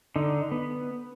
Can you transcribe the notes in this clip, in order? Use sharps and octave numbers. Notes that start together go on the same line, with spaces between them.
D3 D#4
B3